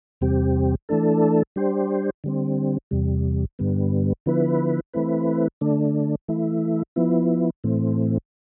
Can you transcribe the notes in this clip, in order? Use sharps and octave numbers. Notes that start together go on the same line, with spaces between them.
E2 C3 G3 C4 G4
E3 A3 D4 A4
G3 D4 G4 C5
D3 G3 C4
E2 C3 G3
G2 D3 G3 B3
D3 F3 B3 E4 B4
E3 A3 C4 E4 B4
D3 A3 D4
E3 A3 E4
F3 B3 E4
A2 E3 A3 C4